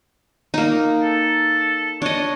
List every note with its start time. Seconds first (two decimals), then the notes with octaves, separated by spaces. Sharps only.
0.54 A#3 D#4
1.03 A4
2.02 D4 C#5 D#5